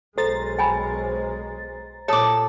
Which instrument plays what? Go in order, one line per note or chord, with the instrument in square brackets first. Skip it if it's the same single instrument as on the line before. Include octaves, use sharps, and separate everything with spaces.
[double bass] B1 G#3 [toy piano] A4 [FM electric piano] C5 A#5 A6
[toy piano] G5 G#5 B5
[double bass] A#2 [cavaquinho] A4 D6 [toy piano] C#5 D#6